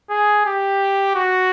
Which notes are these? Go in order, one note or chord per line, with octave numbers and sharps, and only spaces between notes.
G#4
G4
F#4